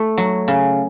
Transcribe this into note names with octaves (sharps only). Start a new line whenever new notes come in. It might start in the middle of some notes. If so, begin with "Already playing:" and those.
Already playing: A3
F#3
C#3